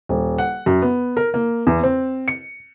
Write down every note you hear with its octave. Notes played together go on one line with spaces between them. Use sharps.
D#1
F#5
F#2
B3
A#4
A#3
E2
C4
C#7